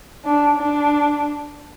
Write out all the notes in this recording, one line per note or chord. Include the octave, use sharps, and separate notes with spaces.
D4
D4